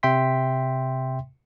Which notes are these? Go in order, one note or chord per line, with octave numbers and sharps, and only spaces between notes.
C3 E5 G5 C6 B6